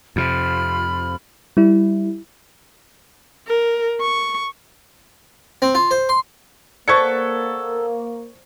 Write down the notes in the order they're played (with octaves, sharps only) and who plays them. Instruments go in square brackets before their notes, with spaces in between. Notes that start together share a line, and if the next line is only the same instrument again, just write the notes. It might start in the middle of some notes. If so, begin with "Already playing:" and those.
[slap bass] F2 C3 [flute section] F4 B5 F6
[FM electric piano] G3 E4
[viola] A#4
C#6
[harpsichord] C4
F4
C5
C6
[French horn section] A#3 [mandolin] B3 A4 [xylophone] C5 D5 [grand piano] C#6 G#6 C#7